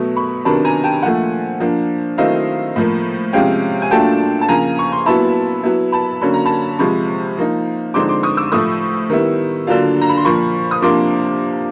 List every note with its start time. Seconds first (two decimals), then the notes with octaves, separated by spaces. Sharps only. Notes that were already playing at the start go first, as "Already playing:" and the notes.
Already playing: B2 F#3 A3
0.16 B5 C#6
0.45 C3 D#3 F#3 B3 D4 A5 B5
0.65 G#5 A#5
0.84 G5 A5
1.03 A#2 F3 A3 F#5 G#5
1.60 F3 A#3 D4
2.18 D#3 F#3 A3 C4 E4 D#5 F5
2.76 A2 F3 A#3
3.33 C3 F3 G#3 C#4 F5 G5
3.82 G#5
3.91 A#2 F#3 A3 D4 F4 G5 A5
4.41 A5
4.48 C#3 F3 A#3 G#5 A#5
4.79 C#6
4.92 C6
5.06 A#2 F#3 B3 E4 A5 B5
5.63 F#3 B3 E4
5.92 A5 B5
6.21 D3 F#3 A#3 C#4 B5
6.34 A#5
6.45 A5 B5
6.79 C3 F3 G#3 B5 C#6
7.37 F3 A#3 D#4
7.94 D3 F3 G#3 C4 D#4 C6 D6
8.09 C6 D6
8.23 C#6 D#6
8.37 D6 E6
8.52 A2 F3 A3 C#6 D#6
9.10 D#3 G3 B3 E4
9.67 D3 F#3 A#3 D4 F4
10.01 A#5
10.09 B5
10.17 C6
10.25 A#2 F3 A#3 B5 C#6
10.71 D#6
10.82 C3 F3 A#3 D4 C6 D6